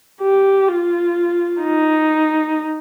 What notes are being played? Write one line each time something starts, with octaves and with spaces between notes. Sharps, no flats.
G4
F4
D#4